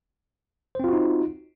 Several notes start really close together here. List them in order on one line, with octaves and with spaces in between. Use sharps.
C5 C4 F4 F#4 D#4